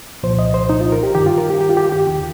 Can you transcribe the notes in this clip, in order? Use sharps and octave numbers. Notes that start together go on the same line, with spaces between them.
C2 A#2 F3 C5
D#5
C5
D#4
F4
A#4
G4
G2 D#3 G4
F4
A#4
G4
G4
F4
G4
G4
D#2 D#3